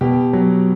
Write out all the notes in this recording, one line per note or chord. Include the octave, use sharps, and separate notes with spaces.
B2 G4
F#3